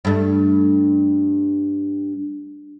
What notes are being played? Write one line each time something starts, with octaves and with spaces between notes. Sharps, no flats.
G2 A3